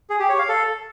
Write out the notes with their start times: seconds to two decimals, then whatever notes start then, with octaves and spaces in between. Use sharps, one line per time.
0.10 G#4
0.19 G4
0.29 C#5
0.39 F5
0.49 A4